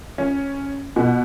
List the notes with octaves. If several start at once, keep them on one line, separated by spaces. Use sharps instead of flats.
C#4
B2